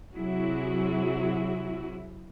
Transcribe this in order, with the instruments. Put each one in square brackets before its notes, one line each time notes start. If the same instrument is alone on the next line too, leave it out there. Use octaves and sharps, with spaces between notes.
[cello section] C3 F#3 E4 F#4 G#4